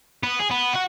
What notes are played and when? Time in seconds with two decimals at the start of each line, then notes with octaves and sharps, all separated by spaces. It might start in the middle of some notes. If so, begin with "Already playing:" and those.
0.23 B3
0.39 G#4
0.51 B3
0.73 F#4 F#5